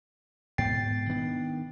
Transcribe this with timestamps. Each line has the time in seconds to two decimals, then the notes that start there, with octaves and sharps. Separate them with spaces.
0.58 G#2 B2 G5 A6 C7
1.09 D#3 B3 D4